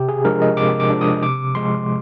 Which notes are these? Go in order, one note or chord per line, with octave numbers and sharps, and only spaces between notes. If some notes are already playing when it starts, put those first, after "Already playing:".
Already playing: C3 G4
G#4
F3 G#3 D4 A#4
D#5
C3 D6
D6
F3 G#3 D4
D#6
C3 D6
F3 G#3 C6